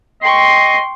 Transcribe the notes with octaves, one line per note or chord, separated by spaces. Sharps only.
D#5 G5 C6 C#6 C7